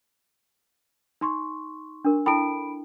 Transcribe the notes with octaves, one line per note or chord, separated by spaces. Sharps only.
D#4 C6 C#6
D4 A#4
E4 A4 G5 B5 D7